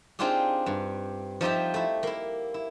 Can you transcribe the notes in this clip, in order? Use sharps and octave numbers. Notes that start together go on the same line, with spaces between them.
C4 D4 D#4 F4 G4 G#4
G2
F3 D#4 F4 G4 E5
A3 E4
A#3 E4
E4